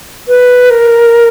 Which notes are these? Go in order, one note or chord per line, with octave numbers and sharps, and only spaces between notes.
B4
A#4